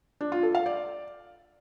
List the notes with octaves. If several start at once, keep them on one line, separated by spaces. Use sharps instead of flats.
D4
F4
A4
F5
D5